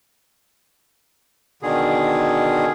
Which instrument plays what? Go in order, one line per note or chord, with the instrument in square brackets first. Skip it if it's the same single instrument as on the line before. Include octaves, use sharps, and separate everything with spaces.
[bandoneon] B2 D3 D#3 G#4